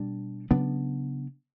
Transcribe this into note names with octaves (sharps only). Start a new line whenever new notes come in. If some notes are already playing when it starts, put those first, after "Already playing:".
Already playing: B2 G3 D4
C#3 F#3 B3 D4